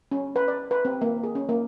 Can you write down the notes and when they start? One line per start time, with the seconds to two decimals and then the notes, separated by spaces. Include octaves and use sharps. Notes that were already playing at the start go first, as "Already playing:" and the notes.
0.11 C#4
0.36 B4
0.48 D5
0.71 B4
0.85 C4
1.01 A#3
1.24 G#4
1.35 C#4
1.49 A#3